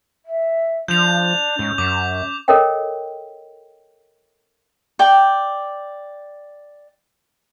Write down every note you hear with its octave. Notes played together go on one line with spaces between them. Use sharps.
E5
F3 D4 G6 F7
G#2 C#4
F#2 D6
A4 A#4 C#5 D#5 G5
D5 G5